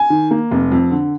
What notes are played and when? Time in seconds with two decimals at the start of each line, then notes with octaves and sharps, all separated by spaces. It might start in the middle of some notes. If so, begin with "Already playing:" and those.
Already playing: G#5
0.10 D#3
0.31 A#3
0.51 F1
0.72 F2
0.91 D3